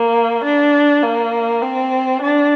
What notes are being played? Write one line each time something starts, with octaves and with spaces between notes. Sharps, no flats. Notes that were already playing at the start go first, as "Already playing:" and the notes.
Already playing: A#3
D4
A#3
C4
D4